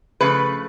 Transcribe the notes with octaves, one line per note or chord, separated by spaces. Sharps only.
C#3 F3 A3 B4